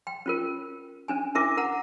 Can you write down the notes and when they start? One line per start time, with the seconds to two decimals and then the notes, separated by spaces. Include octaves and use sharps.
0.07 G5
0.26 C#4 F4 A#4
1.08 C#4 D4 G#5
1.35 C#4 D4 E4 A#4 E5 D6
1.57 A#4 F#5 A#5